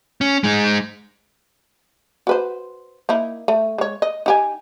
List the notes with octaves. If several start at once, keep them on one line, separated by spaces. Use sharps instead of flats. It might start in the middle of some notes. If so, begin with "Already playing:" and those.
C#4
G#3 D#4
F#4 B4 C5
A#3 D#4 E4
A3
G#3 C#5
D#5
D#4 G4 G#5